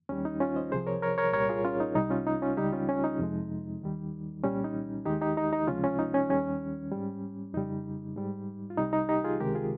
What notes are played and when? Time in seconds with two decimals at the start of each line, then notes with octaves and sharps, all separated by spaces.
0.09 D#2 D#3 G3 C#4
0.25 D#4
0.40 C#4 F4
0.56 C5 D#5
0.71 C2 C3 F3 G#4 C5
0.87 A#4 C#5
1.02 A#4 C#5
1.18 A#4 C#5
1.33 C2 A#2 G3 A#4 C#5
1.49 F4 G#4
1.64 C#4 F4
1.80 D#4
1.95 C2 C3 G3 D#4
2.10 C#4 F4
2.27 D#4
2.42 C#4 F4
2.57 C#2 C#3 G3 D#4 G4
2.73 C#4 F4
2.89 C#4
3.04 D#4
3.19 F2 C3 F3 G#3
3.81 D#2 D#3 G3
4.44 C2 A#2 G3 C#4
4.64 D#4
5.05 D#2 D#3 G#3 D#4 G4
5.21 D#4 G4
5.37 D#4
5.53 D#4
5.67 C#2 C3 F3 G#3 C#4 F4
5.84 C#4 F4
5.99 D#4
6.14 C#4
6.29 D#2 D#3 G3 C#4
6.92 G#2 G3
7.54 F2 C#3 G3 D#4
8.16 G#2 G3
8.70 F4
8.78 C2 C3 G3 D#4
8.93 D#4
9.09 D#4 G4
9.24 F4 G#4
9.40 C#2 C3 D#3 G#3 G4 A#4
9.55 F4 G#4